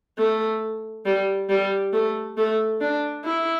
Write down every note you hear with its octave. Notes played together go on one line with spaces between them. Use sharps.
A3
G3
G3
A3
A3
D4
E4